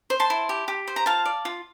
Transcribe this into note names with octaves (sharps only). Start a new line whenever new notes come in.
C5
A5 C6
E4
G4
G4
C5
A#5
F4 F5 A5
D5
F4